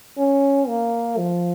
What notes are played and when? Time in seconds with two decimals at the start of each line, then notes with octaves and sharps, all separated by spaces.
0.18 C#4
0.68 A#3
1.18 F3